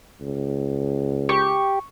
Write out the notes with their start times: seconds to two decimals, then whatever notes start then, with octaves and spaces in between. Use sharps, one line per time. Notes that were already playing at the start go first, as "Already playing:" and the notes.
0.21 C#2
1.29 G4 C#6